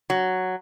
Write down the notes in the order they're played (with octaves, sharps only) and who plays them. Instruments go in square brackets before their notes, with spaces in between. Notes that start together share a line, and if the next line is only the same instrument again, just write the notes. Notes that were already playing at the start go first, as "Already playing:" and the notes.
[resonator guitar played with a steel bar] F#3